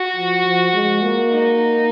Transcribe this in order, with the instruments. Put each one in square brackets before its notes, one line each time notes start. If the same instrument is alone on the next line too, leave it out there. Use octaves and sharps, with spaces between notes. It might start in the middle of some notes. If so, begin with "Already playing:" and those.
Already playing: [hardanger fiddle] F#4
[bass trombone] F3
F3
G#3
A#3
[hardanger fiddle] D#4